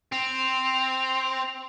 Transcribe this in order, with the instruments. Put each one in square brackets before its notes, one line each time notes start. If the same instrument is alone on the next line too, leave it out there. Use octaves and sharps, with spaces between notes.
[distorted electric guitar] C4 [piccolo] F7